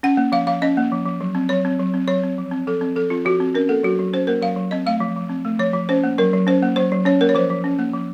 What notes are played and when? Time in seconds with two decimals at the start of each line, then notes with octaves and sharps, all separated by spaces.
0.03 C#4 F#5
0.17 A#3
0.32 F3 F5
0.47 F3 F5
0.62 C#4 D#5
0.77 A#3
0.92 F3
1.06 F3
1.21 F#3
1.35 C4
1.49 F#3 C#5
1.65 C4
1.79 F#3
1.94 C4
2.08 F#3 C#5
2.23 C4
2.38 F3
2.52 C4
2.67 F3 A4
2.81 C4
2.95 F3 A4
3.10 C4 F4
3.25 F3 F#4
3.40 C4
3.55 C#4 A#4
3.69 A#3 A4
3.83 F#3 F#4
3.99 F#3
4.13 C#4 C5
4.27 A#3 A#4
4.42 F#3 F5
4.56 F#3
4.71 C4 D#5
4.86 A3 F5
5.00 F3
5.16 F3
5.30 C4
5.45 A3
5.59 F3 C#5
5.74 F3
5.89 C#4 C5
6.04 A#3
6.18 F#3 A#4
6.33 F#3
6.47 C#4 C5
6.63 A#3
6.76 F#3 C5
6.92 F#3
7.05 C#4 C#5
7.21 A#3 A#4
7.29 C#5
7.35 F3 C5
7.50 F3
7.64 C#4
7.79 A#3
7.93 F3